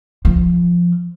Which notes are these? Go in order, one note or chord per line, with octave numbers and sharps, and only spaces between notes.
F3